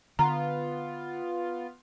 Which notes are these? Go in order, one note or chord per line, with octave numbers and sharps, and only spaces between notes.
D3 B3 F4 A#5